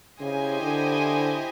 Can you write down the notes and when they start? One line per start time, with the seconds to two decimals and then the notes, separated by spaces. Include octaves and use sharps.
0.21 C#3 E4 G4 C5 D#5 G#5
0.62 D3